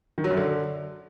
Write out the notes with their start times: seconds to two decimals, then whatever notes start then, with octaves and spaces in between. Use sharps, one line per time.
0.18 D#3
0.24 F#3
0.31 F#2
0.37 D3